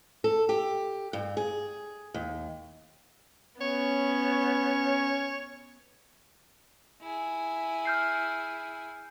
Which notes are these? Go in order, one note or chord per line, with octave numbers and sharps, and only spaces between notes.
A4
G4
G2
G#4
D#2
B3 C#4 C#5
E4 G#4
F6 G6 C7